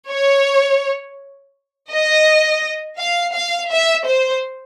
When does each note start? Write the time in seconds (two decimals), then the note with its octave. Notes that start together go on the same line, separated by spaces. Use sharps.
0.09 C#5
1.90 D#5
2.97 F5
3.34 F5
3.70 E5
4.06 C5